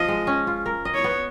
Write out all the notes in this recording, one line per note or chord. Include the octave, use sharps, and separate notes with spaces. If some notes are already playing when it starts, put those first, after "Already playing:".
Already playing: F3 F4 D#5
G#3
C#4
F4
A#4
D#5
C#5
B3